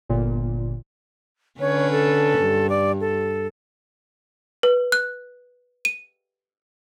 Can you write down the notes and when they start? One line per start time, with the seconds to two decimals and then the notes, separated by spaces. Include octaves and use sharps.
0.09 G1 A#2
1.60 D3 C#4 B4 C#5
1.92 A4
2.40 G2
2.69 D5
3.01 A4
4.63 B4
4.92 F#6
5.85 D#7